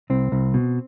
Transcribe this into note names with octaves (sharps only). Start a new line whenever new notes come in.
C2 C4
C2
B2